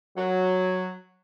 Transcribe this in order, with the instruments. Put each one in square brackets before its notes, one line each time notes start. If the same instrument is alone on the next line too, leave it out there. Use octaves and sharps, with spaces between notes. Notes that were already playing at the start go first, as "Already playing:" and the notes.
[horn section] F#3